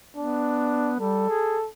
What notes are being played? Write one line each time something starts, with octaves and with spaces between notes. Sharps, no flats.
B3 D4
G3 A4
G#4